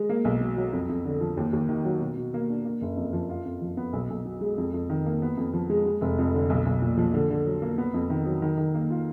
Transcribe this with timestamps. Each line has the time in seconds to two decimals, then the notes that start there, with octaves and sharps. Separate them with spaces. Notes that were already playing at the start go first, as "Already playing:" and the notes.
Already playing: G#3
0.09 A#3
0.25 B1
0.41 B2
0.57 F#3
0.73 F2
0.89 F2
1.05 D3
1.21 F3
1.37 D#2
1.53 D#2
1.69 D#3
1.85 F#3
2.01 B2
2.17 B2
2.34 A#3
2.49 D4
2.65 A#3
2.81 F#1
2.97 F2
3.13 F3
3.29 F4
3.46 F2
3.61 F3
3.77 B3
3.93 B1
4.10 B1
4.25 B2
4.41 G#3
4.58 F2
4.74 F2
4.90 D#3
5.06 A#3
5.22 B3
5.37 F2
5.53 F3
5.70 G#3
5.86 G#3
6.01 F1
6.18 F2
6.34 D3
6.50 B1
6.66 B1
6.82 A#2
6.97 F3
7.14 D3
7.30 D3
7.46 F#3
7.62 A#3
7.78 B3
7.94 F2
8.10 D#3
8.26 F#3
8.42 D#3
8.57 D#3
8.74 A#3
8.90 F4